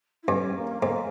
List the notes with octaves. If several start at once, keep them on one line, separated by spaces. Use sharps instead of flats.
E4
G2 C#4
A#3
G#2 A#3